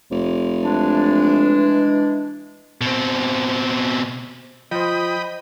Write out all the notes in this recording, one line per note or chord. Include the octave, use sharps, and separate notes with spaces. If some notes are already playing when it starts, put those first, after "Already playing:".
F1
E3 G#3 D4
B2 C4
F3 C5 D#5 G5 B5 D#6